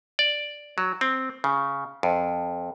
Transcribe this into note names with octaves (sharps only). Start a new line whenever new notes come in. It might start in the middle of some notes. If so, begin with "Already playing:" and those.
D5
F#3
C4
C#3
F2